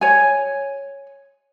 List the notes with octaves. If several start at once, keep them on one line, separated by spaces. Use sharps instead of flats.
C#5 G#5